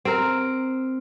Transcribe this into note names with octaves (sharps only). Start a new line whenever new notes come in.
C4 A#4